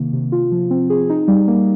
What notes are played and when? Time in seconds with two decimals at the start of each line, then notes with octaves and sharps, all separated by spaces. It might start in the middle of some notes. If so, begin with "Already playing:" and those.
Already playing: C3 D#3 A#3
0.13 C3
0.32 F4
0.52 F3
0.71 C4
0.90 G#4
1.10 D#4
1.28 G3
1.48 A#3